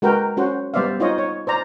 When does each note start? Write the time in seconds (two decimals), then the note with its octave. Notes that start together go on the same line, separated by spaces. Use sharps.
0.02 G#3 F#4 A#4 B4 G5
0.37 C#4 F#4 C5 F#5
0.74 G3 B3 C5 D5 E5 F5
1.00 D#4 F4 C5 C#5 D#5
1.18 C#5
1.47 C5 D5 A#5